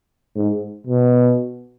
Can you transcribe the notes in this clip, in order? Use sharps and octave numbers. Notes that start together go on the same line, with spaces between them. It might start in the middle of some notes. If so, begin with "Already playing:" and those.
G#2
B2